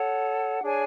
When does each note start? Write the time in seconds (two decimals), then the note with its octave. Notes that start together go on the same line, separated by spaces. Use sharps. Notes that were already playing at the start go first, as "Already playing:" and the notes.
Already playing: A4 C#5 F#5
0.62 D4 G#4 C#5 G#5